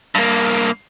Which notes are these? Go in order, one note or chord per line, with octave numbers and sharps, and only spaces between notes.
G2 A#3